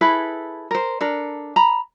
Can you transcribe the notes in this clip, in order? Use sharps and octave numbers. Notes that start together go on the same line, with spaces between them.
E4 G#4 A4 B4
A#4 C5
D4 A4 A#4
A#5 B5